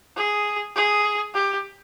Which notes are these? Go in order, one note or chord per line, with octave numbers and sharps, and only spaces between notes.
G#4
G#4
G4